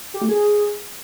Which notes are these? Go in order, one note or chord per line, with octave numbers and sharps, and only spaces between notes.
G4
A3
G#4